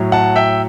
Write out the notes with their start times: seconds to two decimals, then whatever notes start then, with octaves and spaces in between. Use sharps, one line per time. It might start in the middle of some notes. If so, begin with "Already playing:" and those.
Already playing: A2 F#3
0.12 F#5 A5
0.36 E5 G5